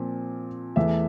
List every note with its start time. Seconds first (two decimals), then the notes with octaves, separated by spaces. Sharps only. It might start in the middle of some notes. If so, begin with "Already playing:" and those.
Already playing: A#2 F3 C4
0.76 E2 E3 A3 E5